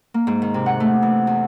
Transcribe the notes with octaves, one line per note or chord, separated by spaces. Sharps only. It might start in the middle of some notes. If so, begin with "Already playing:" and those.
A#3
G#2
D#3
C3
F#5
A3
E3
E2